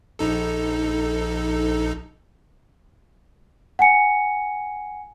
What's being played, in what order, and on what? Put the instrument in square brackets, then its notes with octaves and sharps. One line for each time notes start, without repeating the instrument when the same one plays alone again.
[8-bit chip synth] A#1 D#4 A4
[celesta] F#5 G#5 C#7